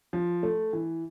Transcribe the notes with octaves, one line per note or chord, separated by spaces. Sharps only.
F3
A3
E3